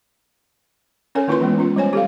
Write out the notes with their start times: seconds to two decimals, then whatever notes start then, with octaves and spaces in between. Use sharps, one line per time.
1.15 C#4 A4 A#4 C#5 G#5
1.28 D#3 A#3 E4 F4 B4 C6
1.41 E3 G#3 A#3 B3
1.58 C#4 F4
1.76 G3 C5 C#5 G#5
1.93 G4 A4 F5